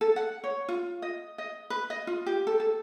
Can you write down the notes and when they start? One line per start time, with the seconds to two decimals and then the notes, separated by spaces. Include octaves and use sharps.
0.01 A4
0.16 F#5
0.44 C#5
0.68 F4
1.02 D#5
1.38 D#5
1.70 B4
1.90 D#5
2.07 F4
2.26 G4
2.47 A4
2.60 A4